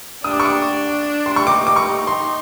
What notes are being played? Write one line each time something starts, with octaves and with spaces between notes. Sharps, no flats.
D4 D#6
D6
C#6
D6
C6
C#6
D#4 D6
D6
C#6
C6